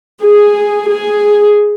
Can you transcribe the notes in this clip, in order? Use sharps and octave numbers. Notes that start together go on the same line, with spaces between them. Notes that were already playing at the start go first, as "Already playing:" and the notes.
G#4
G#4